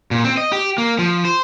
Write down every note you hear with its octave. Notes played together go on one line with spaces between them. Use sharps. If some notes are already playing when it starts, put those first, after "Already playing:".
A#2
C4
D#5
G4
A#3
F3
C5